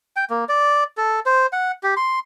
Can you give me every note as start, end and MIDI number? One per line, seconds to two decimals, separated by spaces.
0.16 0.25 79
0.30 0.45 58
0.49 0.84 74
0.97 1.20 69
1.26 1.46 72
1.53 1.72 78
1.83 1.94 67
1.97 2.19 84